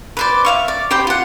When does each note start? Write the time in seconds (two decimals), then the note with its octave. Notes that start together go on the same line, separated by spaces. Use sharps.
0.17 B4 C5 D5
0.45 E5 F5 C#6
0.68 D5
0.91 G4 C5 G5 B5
1.07 F4 F#5